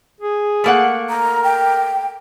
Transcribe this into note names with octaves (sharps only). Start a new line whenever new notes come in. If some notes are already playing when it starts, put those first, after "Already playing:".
G#4
A3 A#3 F#5
A#4 A#5
G5